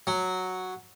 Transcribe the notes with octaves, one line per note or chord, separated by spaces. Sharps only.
F#3